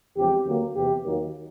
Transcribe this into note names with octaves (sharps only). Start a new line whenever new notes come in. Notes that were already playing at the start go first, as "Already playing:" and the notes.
E2 C#3 F3 G#3 C4 G4
D2 D3 F#3 A#3
E2 C3 E3 G4
D#2 D#3 F#3 A#3